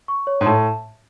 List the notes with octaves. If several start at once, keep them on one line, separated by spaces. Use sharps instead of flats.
C#6
C#5
G#2
A2 A5